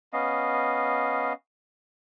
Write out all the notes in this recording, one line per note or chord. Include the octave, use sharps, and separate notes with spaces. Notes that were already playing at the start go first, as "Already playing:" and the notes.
B3 C#4 D#5 F5